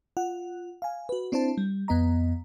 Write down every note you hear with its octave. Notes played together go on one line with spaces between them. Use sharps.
F4 F#5
F5 G#5
F#4 B4
C4 D4 E4 C5 A5
G3
F2 B3 D#5 A#5